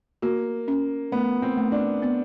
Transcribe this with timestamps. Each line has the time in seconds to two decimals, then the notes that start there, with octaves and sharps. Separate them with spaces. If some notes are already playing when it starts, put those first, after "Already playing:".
0.22 A#3 F#4
0.68 C#4
1.12 A3 B3
1.42 C4
1.58 A3
1.72 D4
2.02 B3